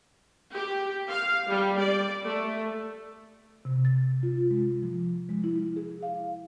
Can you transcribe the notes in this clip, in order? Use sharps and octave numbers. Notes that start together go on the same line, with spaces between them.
G4
F5
G3
D5
A3
C3
A6
F4
G#3
F3
G#3
E4
G#4
F5